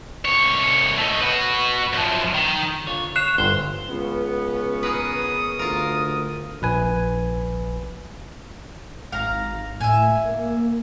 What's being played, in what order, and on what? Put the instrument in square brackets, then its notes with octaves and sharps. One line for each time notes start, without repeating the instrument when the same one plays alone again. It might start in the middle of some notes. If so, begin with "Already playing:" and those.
[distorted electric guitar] C2 C#5
A3 D#4
F#4 B4
F#2 F3
D#3
[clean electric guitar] D3 F4 C#5
[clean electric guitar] C#5 [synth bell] F#6 C7 E7
[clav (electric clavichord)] G1 [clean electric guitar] C5
[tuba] C#2 [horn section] B3 C#4
[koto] G#4 A#4 B4 [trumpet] D#6
[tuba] D2 [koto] F4 A#4
[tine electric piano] A#1 B4 G#5
[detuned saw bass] G#1 [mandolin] F5 A#5
[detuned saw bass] A2 [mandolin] E5 G#5
[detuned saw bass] A#3